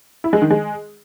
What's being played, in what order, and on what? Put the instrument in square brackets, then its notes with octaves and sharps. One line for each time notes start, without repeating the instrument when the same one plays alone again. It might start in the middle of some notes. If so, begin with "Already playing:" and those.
[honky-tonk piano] E4
G#3
D#3
G#3